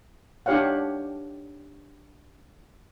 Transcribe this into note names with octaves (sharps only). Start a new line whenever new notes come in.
D4 D#4 G4 C#5 F5 F#5